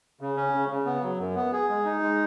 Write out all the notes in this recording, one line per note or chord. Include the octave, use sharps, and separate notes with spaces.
C#3
C#4
C#3
C#3
B3
F#3
F#2
B3
G#4
G#3
D#4
G#3